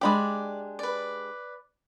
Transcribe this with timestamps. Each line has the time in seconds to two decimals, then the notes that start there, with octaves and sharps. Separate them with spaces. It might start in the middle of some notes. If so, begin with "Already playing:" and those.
0.01 G#3 D4 G4 D5 B5 D6
0.79 B4 D5